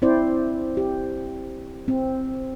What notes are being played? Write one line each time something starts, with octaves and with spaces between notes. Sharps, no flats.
C4 E4 C5 D5
G4
C4